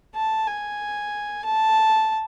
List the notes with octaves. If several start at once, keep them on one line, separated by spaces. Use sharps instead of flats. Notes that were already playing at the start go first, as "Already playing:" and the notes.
A5
G#5
A5